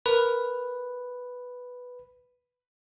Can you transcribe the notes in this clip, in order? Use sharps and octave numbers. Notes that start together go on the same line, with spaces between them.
A#4 B4